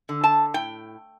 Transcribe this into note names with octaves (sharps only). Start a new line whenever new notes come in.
D3
A5
A2 G5